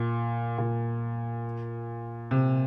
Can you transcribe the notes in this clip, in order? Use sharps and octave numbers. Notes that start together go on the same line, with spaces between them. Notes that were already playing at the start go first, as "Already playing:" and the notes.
Already playing: A#2
A#2
C3